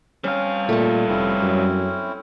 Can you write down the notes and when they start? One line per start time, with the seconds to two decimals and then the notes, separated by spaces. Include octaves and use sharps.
0.24 G3 C4 C#4 F5
0.69 A#2 A3 A5
1.08 F1 C4 C#4 E4
1.40 F#2